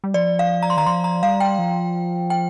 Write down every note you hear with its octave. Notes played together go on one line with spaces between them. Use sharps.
G3
F3 D5
F5
A#5
C6
D#3 A#5
F3 C6
A#5
G3 F5
G5
F3
G5